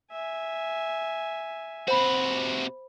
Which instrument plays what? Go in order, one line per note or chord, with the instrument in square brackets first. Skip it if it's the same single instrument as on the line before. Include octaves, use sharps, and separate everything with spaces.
[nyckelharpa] E5 G#5
[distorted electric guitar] C3 F#4 [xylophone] C5 B5